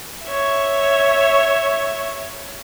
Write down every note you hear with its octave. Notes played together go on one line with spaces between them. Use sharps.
C#5 E5